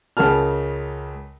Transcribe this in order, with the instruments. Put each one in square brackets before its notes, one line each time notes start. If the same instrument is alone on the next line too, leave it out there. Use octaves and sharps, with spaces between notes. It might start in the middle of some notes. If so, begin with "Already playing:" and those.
[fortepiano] C#2 C#3 A#4 A5 F6